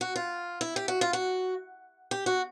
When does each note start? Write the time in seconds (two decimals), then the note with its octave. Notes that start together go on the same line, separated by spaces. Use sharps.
0.01 F#4
0.16 F4
0.61 E4
0.76 G4
0.88 F#4
1.01 F4
1.13 F#4
2.11 G4
2.26 F#4